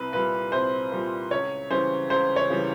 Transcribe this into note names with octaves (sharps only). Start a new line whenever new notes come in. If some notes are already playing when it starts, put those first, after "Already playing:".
Already playing: C2 B4
A#2 G3 B4
C2 C5
A#2 G3
C#2 C#5
C#3 E3 G3 C5
C#2 C5
C#5
C#3 E3 G3